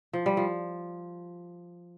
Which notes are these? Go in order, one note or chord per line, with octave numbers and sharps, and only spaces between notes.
F3
G3
F3